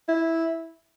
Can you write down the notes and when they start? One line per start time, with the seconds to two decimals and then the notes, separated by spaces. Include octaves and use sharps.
0.08 E4